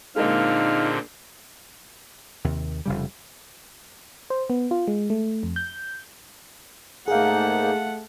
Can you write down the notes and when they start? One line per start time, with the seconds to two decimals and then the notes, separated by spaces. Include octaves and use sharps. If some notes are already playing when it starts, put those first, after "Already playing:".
0.16 A#2 D3 G#3 A#3 C4 D#4 D#5 F5
2.44 D#2 C3
2.86 F1 C#3 G3
4.30 C5
4.50 B3
4.71 F4
4.88 G#3
5.10 A3
5.43 F2
5.56 G6
7.08 G#2 A3 A#3 D#4 G#4 F5 F#5